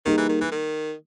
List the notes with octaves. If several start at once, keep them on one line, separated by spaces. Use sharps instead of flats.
D#3 G3 A#3 D#4 G#4
E3
D#3
E3
D#3